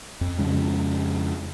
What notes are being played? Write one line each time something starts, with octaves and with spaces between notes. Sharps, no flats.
F2
F2 C#3 G#3